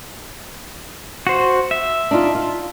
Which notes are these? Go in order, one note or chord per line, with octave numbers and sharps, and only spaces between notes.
F#4 C5
E5
D4 D#4 F4
F4